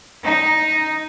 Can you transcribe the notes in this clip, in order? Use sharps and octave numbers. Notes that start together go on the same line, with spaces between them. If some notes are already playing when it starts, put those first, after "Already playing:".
D#4